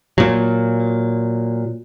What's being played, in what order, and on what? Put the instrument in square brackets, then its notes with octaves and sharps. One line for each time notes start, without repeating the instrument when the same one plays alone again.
[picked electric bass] A#2 F#3